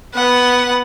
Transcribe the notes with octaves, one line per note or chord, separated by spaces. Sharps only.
B3 F#5